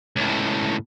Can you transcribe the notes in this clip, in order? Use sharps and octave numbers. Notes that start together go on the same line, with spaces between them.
C#2 A2